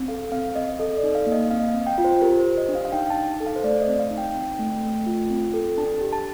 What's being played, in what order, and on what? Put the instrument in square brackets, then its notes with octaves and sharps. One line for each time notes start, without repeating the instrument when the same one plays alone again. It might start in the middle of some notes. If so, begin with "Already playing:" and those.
Already playing: [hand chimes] C4
A4 F5
C4 F5
C4 D#5
A4 D#5
D5
D#4
F5
A#3
D#5
C4 F5
D#5
F5
C4
G5
F4
C5
G4 A#4
C5
G4
D#5
D4
F5
F5
D#4 G5
A5
D#4
A4
F5
C5
A3 D5
D#5
C4
F5
D#4
G5
C4
A3
A3
F4
C4
A4
D4 A5
G4
A5